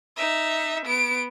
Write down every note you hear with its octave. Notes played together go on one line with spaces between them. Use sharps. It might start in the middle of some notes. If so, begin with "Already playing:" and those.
D#4 E5
B3 D7